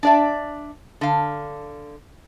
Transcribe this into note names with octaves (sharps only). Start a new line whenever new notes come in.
D4 D5 E5
D3 F5